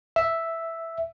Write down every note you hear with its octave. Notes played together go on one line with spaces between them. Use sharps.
E5